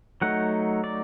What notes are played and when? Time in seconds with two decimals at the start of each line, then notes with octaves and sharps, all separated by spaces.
0.22 F#3 A3 D#4 F#5
0.84 D5